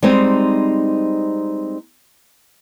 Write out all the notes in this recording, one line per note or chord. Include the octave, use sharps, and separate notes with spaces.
G3 G#3 C4 D#4